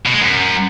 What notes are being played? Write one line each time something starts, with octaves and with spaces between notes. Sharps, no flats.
B2
G#3
F#2